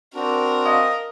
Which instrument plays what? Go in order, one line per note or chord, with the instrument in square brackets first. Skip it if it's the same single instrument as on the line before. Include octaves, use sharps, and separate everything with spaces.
[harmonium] C4 D4 F#4 [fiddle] A#4
[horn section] D#5 [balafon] F5